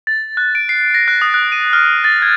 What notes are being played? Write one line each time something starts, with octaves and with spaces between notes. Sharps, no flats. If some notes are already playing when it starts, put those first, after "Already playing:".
A6
F#6
D7
C7
A#6
F#6
D#6
F#6
D#7
F6
A6
G#6